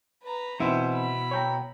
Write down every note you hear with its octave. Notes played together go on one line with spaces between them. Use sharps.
B4 A#5
B2 E3 C4 E4 C5
B5
C#5 G5 A#5